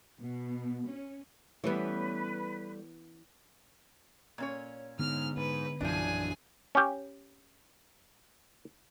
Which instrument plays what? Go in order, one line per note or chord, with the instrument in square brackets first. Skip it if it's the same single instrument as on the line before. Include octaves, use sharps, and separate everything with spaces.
[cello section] B2
C#4
[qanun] E3 [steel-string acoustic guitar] G3 A3 [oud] B3 C#4 [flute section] B4
[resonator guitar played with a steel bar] A#2 C#4 C#5
[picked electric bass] G#2 [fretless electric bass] D3 B3 [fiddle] F6
[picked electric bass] G#2 [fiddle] B4
[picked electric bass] A#1 F#2 E3 [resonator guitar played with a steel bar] F3 D4 [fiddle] G#4 G#5
[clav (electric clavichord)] C#4 G4